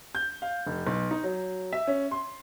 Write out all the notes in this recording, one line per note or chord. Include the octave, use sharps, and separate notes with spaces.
G6
F5
F1
B1
D#4
F#3
E5
C#4
C6